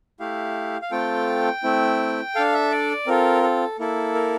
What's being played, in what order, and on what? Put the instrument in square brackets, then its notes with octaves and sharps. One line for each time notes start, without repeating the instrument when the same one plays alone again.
[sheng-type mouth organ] A3 E4 G4 F5
F5
A3 C4 F4 A4 G5
A3 C4 E4
D4 A4 F5
E5
D5
C4 F4 A4 A#4
A4
A#3 E4 A4
A#4